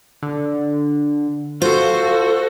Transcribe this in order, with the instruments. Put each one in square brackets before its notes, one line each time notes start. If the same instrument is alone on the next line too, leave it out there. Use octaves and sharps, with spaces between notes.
[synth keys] D3
[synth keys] F4 [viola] F#4 A4 [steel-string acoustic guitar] C5